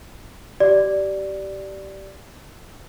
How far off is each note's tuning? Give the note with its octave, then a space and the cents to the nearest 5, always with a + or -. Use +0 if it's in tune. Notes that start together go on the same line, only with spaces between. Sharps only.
G4 -25 D5 +0